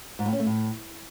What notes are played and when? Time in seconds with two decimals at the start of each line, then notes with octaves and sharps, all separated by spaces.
0.19 G#2
0.26 A2
0.33 C#4
0.40 A3
0.46 A2